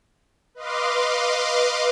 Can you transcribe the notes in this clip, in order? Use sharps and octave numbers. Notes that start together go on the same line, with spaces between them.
B4 D#5 F5 C6 D6